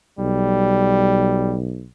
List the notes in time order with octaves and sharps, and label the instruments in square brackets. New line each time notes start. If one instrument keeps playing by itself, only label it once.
[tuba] B1 [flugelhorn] G3